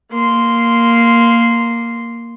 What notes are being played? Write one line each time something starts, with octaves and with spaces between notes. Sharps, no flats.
A#3 C6